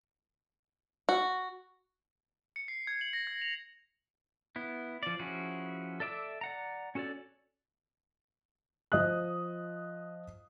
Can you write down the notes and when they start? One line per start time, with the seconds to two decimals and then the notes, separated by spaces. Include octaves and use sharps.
1.09 F#4
2.56 C#7
2.68 C7
2.87 G#6
3.01 F#7
3.13 A#6
3.27 G#6
3.42 F7
4.56 B3 E4
5.03 F3 D5
5.19 F3 C#4 E4 F#4 G#4
6.00 A4 D5 E5 D6 E6
6.41 D5 F#5 A#5
6.95 C#4 F#4 A4 C#5 D5
8.92 F3 D#5 D#6 F#6